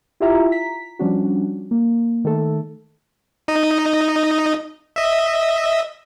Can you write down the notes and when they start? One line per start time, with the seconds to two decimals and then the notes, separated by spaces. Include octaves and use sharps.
0.20 E4 F4 G4 E5 A#5
0.49 A#5 B6
0.99 F3 G3 C#4 D4 F#4
1.71 A#3
2.24 D#3 A3 A4
3.48 D#4 D#5
4.96 D#5 E5